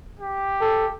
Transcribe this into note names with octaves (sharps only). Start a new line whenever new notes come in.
G4
A4